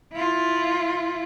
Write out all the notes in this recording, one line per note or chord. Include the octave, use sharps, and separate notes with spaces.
E4 F4